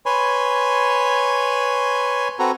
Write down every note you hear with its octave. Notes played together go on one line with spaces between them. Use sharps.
B4 C#5 G#5 B5 C6
C4 F#4 A4 B4 A#5